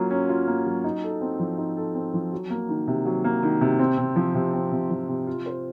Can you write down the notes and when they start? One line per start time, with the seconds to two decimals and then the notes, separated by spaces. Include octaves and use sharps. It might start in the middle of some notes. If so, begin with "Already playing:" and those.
Already playing: F#3 A#3 C#4 F4
0.11 C#4
0.29 F4
0.47 A#3
0.66 F#3
0.84 D#4
1.03 A4
1.21 C4
1.39 F3
1.58 D#4
1.77 A4
1.95 C4
2.14 F3
2.32 F#3
2.50 A#3
2.69 D#3
2.88 C3
3.05 F#3
3.24 A#3
3.43 D#3
3.61 C3
3.79 C4
3.98 C3
4.16 F3
4.35 C3
4.53 C4
4.72 C3
4.90 F3
5.09 C3
5.27 F4
5.46 C5